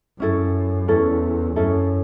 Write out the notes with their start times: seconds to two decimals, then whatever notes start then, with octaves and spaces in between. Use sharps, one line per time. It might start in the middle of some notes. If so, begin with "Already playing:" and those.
0.20 F#2 C#4 E4 A4
0.88 E2 C#4 E4 A4
1.56 F#2 C#4 E4 A4